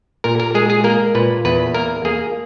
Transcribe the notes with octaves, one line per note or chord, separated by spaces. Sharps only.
A#2 A#4
A#4
G#3 G#4
G#4
A#3 A#4
A#2 B4
E2 B4
A#3 A#4
A#3 G#4